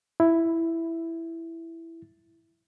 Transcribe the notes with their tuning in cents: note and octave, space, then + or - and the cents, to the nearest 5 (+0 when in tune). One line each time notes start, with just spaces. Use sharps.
E4 +5